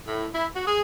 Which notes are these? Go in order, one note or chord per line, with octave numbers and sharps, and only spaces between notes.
A2
E4
F#4
G#4